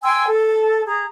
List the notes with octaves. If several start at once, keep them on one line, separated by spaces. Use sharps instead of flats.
G5 G#5 C6 E6
A4
G#4 A#5